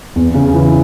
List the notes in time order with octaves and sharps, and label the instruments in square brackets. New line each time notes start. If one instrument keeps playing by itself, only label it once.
[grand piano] E2
C#3
E3